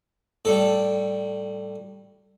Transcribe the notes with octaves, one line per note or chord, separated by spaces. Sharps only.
A2 G3 A4